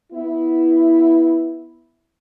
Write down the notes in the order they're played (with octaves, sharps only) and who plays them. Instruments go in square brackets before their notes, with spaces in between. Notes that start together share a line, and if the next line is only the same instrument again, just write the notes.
[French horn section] B3 E4